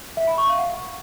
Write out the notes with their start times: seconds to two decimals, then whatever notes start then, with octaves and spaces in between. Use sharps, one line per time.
0.17 E5
0.27 B5
0.38 C#6
0.48 F5
0.59 F#5